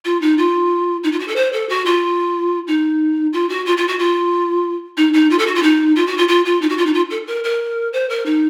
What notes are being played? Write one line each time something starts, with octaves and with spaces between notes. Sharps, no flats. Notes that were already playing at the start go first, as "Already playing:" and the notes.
F4
D#4
F4
D#4
F4
F#4
A4
C5
A4
F#4
F4
D#4
F4
F#4
F4
F4
F#4
F4
D#4
D#4
F4
A4
F#4
F4
D#4
F4
F#4
F4
F4
F4
D#4
F#4
F4
D#4
F4
A4
A#4
A#4
C5
A#4
D#4